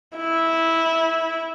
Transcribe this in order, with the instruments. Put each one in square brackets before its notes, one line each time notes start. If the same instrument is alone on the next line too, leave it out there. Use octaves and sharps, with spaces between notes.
[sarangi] E4